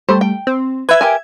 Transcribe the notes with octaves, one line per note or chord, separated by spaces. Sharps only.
G3 A3 C5
G5
C4
B4 E5 G#6
G4 A#4 G#5